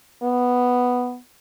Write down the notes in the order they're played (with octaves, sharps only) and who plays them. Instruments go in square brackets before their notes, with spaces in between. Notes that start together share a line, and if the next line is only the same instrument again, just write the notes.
[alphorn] B3